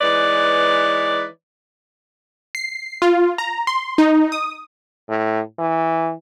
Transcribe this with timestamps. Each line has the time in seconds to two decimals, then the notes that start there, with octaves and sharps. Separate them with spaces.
0.01 E3 G#3 D#4 B4 C#5 D5
2.55 C7
3.02 F4
3.38 A#5
3.67 C6
3.98 D#4
4.32 D#6
5.09 A2
5.59 E3